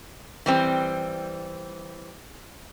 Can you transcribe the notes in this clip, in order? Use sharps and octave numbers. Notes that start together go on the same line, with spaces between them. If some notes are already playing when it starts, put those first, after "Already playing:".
E3 G3 C4